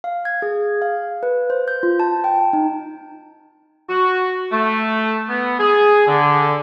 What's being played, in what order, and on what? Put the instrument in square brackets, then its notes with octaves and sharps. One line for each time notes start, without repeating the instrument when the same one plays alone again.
[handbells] F5
G#6
G#4
F5
B4
C5
G6
F4
A5
G5
D#4
[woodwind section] F#4
A3
B3
G#4
D3